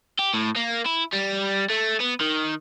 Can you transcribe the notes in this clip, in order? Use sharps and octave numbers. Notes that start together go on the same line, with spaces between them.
G4
A2
A#3
E4
G3
A3
B3
D#3